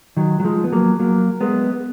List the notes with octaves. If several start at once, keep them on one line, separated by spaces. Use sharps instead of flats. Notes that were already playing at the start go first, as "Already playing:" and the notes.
D#3 F#3
F#3
F3 G#3
B3
F#3 A#3
F#3 A#3
G#3 B3